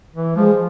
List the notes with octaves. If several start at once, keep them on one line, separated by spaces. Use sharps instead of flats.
E3
F3 G#3